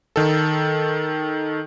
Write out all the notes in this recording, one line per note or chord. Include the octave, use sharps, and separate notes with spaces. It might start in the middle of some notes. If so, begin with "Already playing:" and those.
D#3 A4